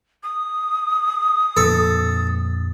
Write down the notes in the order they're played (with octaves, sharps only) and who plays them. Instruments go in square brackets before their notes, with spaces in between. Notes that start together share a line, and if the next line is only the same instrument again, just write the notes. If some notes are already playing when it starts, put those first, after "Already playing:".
[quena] D#6
[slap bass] F2 A#2 D3 [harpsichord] A4